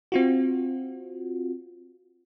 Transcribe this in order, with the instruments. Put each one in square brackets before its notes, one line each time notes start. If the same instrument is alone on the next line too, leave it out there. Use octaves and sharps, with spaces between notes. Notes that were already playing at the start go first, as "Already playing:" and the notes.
[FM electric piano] C4 F4 F#4